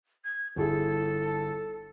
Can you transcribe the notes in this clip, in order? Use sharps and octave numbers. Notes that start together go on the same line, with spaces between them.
G#6
G1 E4 G#4 A4